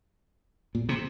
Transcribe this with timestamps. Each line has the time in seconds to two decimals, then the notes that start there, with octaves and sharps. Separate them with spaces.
0.75 A#2
0.89 C3